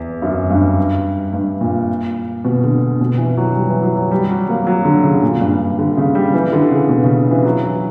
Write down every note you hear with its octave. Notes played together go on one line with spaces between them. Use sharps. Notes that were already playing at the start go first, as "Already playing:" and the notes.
Already playing: E2
F#2
G2
G2
A#2
B2
D3
B2
E3
F#3
G3
E3
F#3
F#3
G3
F#3
A#3
F#3
D3
C#3
A#2
G2
D3
C#3
G3
E3
D3
C#3
B2
C#3
E3
F#3
E3